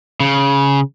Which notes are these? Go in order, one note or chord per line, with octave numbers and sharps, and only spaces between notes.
C#3